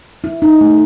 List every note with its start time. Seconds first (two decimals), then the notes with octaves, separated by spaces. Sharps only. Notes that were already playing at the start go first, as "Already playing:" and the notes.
0.24 E4
0.42 D#4
0.61 A3